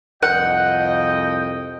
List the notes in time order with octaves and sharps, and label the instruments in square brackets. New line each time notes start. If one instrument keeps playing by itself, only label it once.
[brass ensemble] C2 F2 D#5 [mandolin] F#5 [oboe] G5